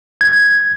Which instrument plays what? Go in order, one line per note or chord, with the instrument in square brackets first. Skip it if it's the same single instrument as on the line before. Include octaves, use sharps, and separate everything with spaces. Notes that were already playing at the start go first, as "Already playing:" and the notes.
[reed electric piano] G#6